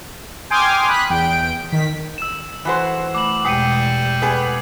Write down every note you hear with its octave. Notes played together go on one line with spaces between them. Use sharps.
G5 G#5 C6 D6 D#6 F6
B5 D#6 F#6 B6
E2 G5 D7
D#3 B6
E6 E7
E3 F#4 C5
A3 B5 D6 F#7
E2 B2 G3 G#3 G5 C7 C#7 D#7
B3 G#4